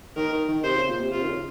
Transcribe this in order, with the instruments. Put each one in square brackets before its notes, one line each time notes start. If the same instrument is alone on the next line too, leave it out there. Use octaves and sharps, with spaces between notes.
[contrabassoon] D#3 [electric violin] A#4
[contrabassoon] D#3
D#3
[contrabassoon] C3 [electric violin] C5
[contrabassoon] C#3
A#2
C3
[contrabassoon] C3 [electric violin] F4
[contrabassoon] D#3
C#3